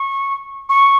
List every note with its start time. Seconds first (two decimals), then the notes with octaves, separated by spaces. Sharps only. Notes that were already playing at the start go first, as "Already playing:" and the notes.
Already playing: C#6
0.69 C#6